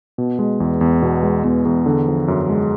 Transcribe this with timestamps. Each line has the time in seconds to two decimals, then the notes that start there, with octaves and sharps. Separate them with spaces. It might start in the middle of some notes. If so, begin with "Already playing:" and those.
0.18 B2
0.39 G#3
0.60 E2
0.81 E2
1.02 B2
1.23 G#3
1.44 E2
1.65 E2
1.86 D3
2.08 F3
2.28 F#2
2.49 G#3